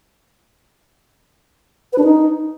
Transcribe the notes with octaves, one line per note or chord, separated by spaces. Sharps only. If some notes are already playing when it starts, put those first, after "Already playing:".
B4
D4
D#4